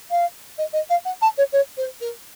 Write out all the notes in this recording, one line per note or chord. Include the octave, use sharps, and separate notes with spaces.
F5
D#5
D#5
F5
F#5
A5
C#5
C#5
C5
A#4